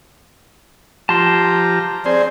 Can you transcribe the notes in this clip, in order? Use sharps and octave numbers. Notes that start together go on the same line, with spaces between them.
F3 G4 A5 A#5 C6
C4 G#4 C5 D5